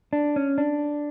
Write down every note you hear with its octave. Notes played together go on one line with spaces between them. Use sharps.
D4
C#4
D4